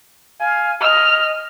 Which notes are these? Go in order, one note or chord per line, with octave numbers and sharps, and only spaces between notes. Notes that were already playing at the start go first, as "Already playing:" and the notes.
F5 G#5
D#5 F6